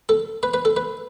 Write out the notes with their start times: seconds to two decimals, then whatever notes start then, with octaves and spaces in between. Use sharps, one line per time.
0.09 A4
0.43 B4
0.54 B4
0.65 A4
0.76 B4